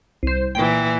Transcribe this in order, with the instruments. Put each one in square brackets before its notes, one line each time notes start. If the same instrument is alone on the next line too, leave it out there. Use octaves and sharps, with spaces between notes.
[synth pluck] C2 C5
[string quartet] A#2 E3 [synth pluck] G5